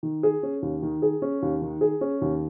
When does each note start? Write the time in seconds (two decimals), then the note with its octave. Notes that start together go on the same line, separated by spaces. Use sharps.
0.03 D#3
0.23 G#4
0.43 C#4
0.62 D#2
0.82 D#3
1.02 G#4
1.22 C#4
1.42 D#2
1.62 D#3
1.81 G#4
2.01 C#4
2.21 D#2